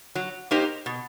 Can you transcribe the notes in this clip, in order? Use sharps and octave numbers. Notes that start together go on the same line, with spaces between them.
F#3
A#3 D#4 G4 C5
B2